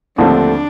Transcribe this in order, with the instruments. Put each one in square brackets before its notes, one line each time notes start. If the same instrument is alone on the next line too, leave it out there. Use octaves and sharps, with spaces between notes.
[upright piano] D#2 D3 F3 A3 C4 [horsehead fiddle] D4